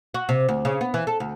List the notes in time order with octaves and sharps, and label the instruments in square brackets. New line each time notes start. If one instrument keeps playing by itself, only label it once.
[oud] F#4
C3
D2
C#3
B3
E3
A4
D2